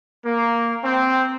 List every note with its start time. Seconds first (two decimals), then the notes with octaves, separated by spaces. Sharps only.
0.24 A#3
0.82 C4